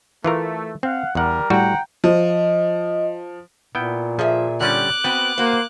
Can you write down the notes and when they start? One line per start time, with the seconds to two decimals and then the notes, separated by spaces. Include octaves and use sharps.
0.24 E3 A3 F4 A#4
0.83 C4 F5 F#5
1.15 E2 G3 A#4 F#5
1.50 A2 G3 F#4 F#5 G5 A#5
2.04 F3 D#5
3.75 A#2 B3 E4 G5
4.19 F3 G#4 E5
4.61 D3 G3 C#4 G4 D5 D6 F#6
5.04 B3 C4 F#4 B4 G5
5.38 A#3 F#4 C5